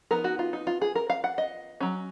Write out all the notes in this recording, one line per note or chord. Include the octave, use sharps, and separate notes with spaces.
F3 B3 D#4 A#4
F#4
F4
D#4
F4
G#4
A#4
F5
F#5
D#5
F#3 C#4